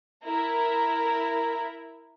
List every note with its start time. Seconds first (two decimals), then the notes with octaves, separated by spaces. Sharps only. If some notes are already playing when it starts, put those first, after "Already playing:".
0.25 E4 A#4